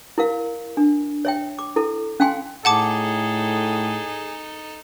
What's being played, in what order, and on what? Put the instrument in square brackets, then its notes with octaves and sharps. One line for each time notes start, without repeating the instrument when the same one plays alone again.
[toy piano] E4 A#4 F5
D4
C#5 E5 G5
D6
E4 A4
C#4 F5 G5 G#5 C6
[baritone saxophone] A2 [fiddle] D#4 A4 [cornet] G#4 [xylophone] F#5 A5 D6